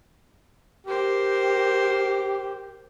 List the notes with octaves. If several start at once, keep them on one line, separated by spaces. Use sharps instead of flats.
G4 A#4 C5